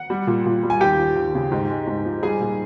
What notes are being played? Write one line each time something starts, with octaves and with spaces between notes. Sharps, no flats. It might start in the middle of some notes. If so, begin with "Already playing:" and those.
Already playing: F#5
G3
A#2
A#2
G3
G#5
D#2 G4 G5
F3
D#2
C#3
G#2
G#3
G#2
F3
G3 G#4 G#5
A#2